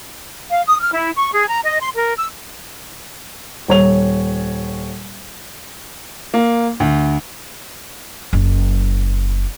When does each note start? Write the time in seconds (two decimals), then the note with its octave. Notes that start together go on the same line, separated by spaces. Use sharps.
0.50 F5
0.66 D#6
0.80 F6
0.92 E4
1.15 C#6
1.33 G#4
1.47 A#5
1.65 D#5
1.80 C6
1.94 A#4
2.17 E6
3.68 D#1 C#5 F7
6.34 A#3
6.80 D2
8.33 F#1